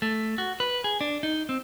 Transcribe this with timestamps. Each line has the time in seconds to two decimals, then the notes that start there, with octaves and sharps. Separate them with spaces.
0.02 A3
0.38 F#4
0.60 B4
0.84 G#4
1.01 D4
1.23 D#4
1.49 C4